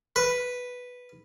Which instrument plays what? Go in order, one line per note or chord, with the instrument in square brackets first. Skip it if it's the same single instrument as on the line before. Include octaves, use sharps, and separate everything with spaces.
[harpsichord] B4